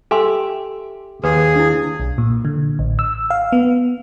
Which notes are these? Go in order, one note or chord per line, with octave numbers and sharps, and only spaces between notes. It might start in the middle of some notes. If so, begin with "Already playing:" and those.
G4 A4 E5 G#5 C6
D#2 G#4 B4
D4 E4
B1
A#2
D3
A1
E6
F5
B3